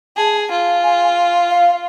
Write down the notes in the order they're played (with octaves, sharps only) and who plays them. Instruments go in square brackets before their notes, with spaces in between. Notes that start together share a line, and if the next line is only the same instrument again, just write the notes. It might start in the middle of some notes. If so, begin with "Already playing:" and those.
[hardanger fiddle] G#4 [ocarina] A5
[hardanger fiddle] F4
[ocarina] G#5
F5